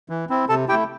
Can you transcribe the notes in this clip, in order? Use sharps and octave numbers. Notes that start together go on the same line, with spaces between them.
E3
C4 E4
C3 A4 A5
A3 E4 G4 G5